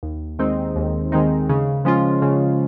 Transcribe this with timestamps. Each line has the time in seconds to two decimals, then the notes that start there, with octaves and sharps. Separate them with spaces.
0.03 D#2
0.39 D#3 G#3 C4 D#4
0.76 D#2
1.12 D#3 G#3 C4 D#4
1.49 C#3
1.85 F3 G#3 C#4 F4
2.22 C#3